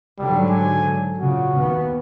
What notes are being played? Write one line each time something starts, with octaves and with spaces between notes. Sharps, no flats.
G#2 D3 F#3 G3
G#5
A#2 C#3 F#4
D#2 B3